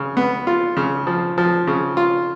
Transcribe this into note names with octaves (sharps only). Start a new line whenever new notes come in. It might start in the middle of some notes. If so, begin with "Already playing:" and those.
Already playing: C#3
B3
F4
C#3
F3
F3
C#3
F4